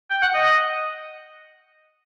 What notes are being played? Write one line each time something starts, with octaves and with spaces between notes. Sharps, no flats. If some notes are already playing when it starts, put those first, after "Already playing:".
G5
F#5
D#5